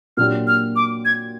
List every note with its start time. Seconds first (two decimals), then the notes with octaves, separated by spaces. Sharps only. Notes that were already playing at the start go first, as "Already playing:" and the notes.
0.17 A#2 F#3 A#3 D4 G4 F6
0.47 F6
0.76 D6
1.05 G#6